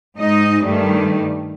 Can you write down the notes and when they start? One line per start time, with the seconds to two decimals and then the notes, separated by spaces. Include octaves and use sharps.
0.18 G#2 D#4 D#5
0.65 G2 D#3 G3 A3